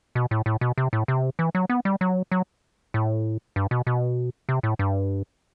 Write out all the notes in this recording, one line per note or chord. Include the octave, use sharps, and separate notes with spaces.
B2
A2
A2
B2
C3
A2
C3
E3
F#3
B3
G3
F#3
F#3
A2
G2
B2
B2
C3
A2
G2